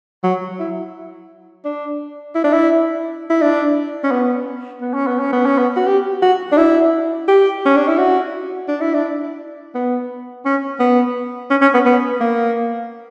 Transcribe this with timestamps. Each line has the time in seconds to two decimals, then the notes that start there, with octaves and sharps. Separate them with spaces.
0.24 F#3
0.59 E4
1.65 D4
2.35 E4
2.44 D4
2.53 E4
3.30 E4
3.41 D4
4.04 C#4
4.11 B3
4.81 B3
4.94 C#4
5.07 B3
5.20 C#4
5.33 B3
5.46 C#4
5.58 B3
5.77 F#4
5.87 G4
6.22 F#4
6.52 D4
6.57 E4
7.28 G4
7.66 C#4
7.77 D4
7.88 E4
7.98 F#4
8.68 D4
8.81 E4
8.94 D4
9.75 B3
10.46 C#4
10.80 B3
11.51 C#4
11.62 C#4
11.74 B3
11.86 B3
12.20 A#3